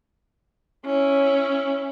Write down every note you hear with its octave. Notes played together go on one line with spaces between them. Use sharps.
C#4 E4